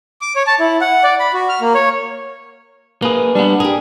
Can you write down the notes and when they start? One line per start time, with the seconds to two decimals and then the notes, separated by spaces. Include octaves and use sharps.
0.21 D6
0.36 C#5
0.47 A5
0.60 E4
0.81 F#5
1.03 D5
1.20 B5
1.33 F#4
1.49 F6
1.61 A#3
1.74 C#5
3.02 A#3 G#4 B4
3.35 G3 B3 D4
3.60 G4 G#4 A#4